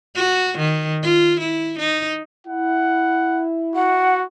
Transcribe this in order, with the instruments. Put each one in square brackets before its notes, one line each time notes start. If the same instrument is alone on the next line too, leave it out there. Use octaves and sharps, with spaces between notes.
[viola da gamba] F#4
D#3
F4
E4
D#4
[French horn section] E4 [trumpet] F#5
[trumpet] F#4 [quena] F#5